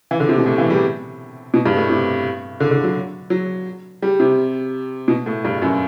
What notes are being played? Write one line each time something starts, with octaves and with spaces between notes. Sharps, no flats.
E3
D3
C3
B2
A2
E3
G3
B2
G2
A2
C3
D3
D3
F#3
F#3
G3
C3
B2
A2
G2
F#2